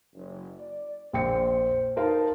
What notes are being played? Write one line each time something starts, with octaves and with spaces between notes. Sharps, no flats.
F#1
D5
A#1 C5 G5 C#7
D#4 A#4 C5 F5 A5